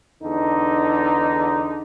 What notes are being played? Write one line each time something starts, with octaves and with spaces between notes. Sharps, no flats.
E2 D3 D#4